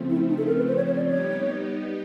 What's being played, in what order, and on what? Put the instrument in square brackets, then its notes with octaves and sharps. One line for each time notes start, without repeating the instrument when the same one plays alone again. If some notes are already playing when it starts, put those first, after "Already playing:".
Already playing: [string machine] C#3 F3 A3 C4
[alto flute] E4
D#4
A4
A#4
B4
C5
C#5
C#5
D5
[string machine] G3 B3 D#4 G4 [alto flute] C#5